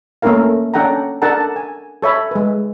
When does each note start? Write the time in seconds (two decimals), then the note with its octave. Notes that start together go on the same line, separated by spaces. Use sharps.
0.22 A3 A#3 C#4 E4 A#4 F5
0.74 C#4 D4 A4 F#5 G5 A#5
1.22 D4 A4 A#4 F#5 A5 A#5
1.56 G#5
2.02 A4 C#5 E5 B5
2.31 G#3 B4